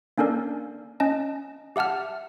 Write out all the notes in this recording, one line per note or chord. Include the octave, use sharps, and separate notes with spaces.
A#3 C#4 D4 A4 A#4 D5
C#4 D#5 A5
G4 E5 F#5 A5 F6